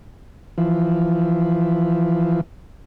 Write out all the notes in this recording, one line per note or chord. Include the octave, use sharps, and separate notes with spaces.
E3 F3